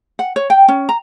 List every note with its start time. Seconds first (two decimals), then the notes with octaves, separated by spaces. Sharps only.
0.19 F#5
0.36 C#5
0.50 G5
0.68 C#4
0.89 A#5